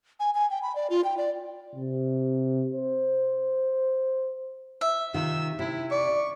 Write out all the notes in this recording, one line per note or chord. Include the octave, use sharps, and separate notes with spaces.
G#5
G#5
G5
B5
D5
F4
G5
D5
C3
C5
E5
C3 D#3 F4 E6
C3 E4
D5 C#6